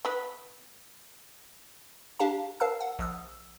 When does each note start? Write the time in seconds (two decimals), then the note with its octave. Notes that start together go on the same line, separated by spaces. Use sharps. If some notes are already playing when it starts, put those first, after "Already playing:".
0.05 B3 B4
2.19 D4 G4 F5 A5
2.60 A#4 F5 A5 E6
2.81 F#5
2.99 A#1 D#6 E6